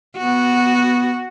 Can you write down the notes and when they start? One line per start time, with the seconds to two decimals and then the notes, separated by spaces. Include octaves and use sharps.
0.18 B3 F#4